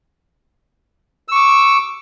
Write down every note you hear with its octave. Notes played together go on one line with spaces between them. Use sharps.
C#6 D6 E6